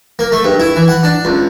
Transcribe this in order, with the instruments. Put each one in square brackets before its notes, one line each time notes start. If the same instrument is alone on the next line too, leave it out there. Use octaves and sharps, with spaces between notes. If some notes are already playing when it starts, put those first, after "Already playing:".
[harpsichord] A#3
A3
G2
E4
E3
F#5
D4
C#2